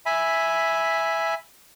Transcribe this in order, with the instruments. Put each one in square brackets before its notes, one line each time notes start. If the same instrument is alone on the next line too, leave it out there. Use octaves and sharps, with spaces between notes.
[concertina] E5 G#5 B5